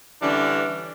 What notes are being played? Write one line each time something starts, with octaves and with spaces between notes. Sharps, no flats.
D3 E3 G3 C#4 D4